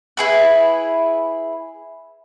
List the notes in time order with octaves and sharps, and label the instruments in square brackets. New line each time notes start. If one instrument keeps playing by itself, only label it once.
[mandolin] E4 G#4 B4